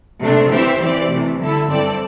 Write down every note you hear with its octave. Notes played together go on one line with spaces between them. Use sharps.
C3 A3 D4
E3 C4 G4 C5 E5
E3 C4 G4 D5
C3 E3 A3
D3 G3 E4 A4
G2 E3 C4 A4 D5